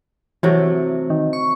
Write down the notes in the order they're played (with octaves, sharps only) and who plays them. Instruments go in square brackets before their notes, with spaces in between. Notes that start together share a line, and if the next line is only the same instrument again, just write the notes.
[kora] C3 F#3 A3 [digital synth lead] E3
[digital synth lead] D#3
C#6